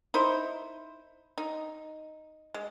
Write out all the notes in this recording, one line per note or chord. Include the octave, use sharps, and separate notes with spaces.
D#4 E4 C5
D#4
G#3